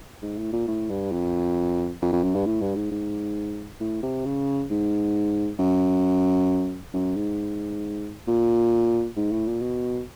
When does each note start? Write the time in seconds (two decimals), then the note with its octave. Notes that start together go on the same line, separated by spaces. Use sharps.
0.22 G#2
0.38 A2
0.53 A#2
0.67 A2
0.90 G2
1.12 F2
2.02 F2
2.13 F2
2.24 F#2
2.35 G2
2.46 A2
2.61 G2
2.76 G#2
2.91 G#2
3.80 A2
4.03 C3
4.25 C#3
4.70 G#2
5.59 F#2
6.93 F#2
7.16 G#2
8.27 A#2
9.17 G#2
9.32 A2
9.47 A#2
9.61 B2